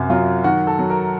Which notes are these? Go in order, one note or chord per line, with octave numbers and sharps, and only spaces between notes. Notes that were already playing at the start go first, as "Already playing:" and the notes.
Already playing: F#2 C3 F#4
F#3 F4
D#3 F#4
A4
F#3
A#4